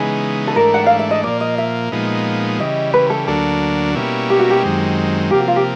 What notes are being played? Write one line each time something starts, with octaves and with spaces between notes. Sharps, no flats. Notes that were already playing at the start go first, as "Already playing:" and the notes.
Already playing: C#3 E3 G#3 B3 D#4 G#4
A4
G#2 E3 A3 D4 A#4
F#5
F5
E5
D#5
A#2 F3 A#3 D5
D#5
E5
A#2 F3 G#3 B3 D#4
C#3 E3 G3 D#5
B4
A4
D2 D3 F#3 A#3 D4 A4
B2 G3 A#3 C#4 E4
G4
F#4
G4
F#2 D#3 G#3 C4
C3 F3 A#3 G4
F#4
F4
G4